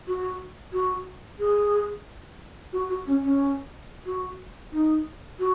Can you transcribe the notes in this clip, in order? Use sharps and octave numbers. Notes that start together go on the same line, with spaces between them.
F#4
F#4
G#4
F#4
F#4
C#4
C#4
F#4
D#4
F#4